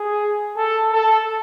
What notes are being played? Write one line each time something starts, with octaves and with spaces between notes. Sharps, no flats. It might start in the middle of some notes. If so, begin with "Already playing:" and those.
Already playing: G#4
A4
A4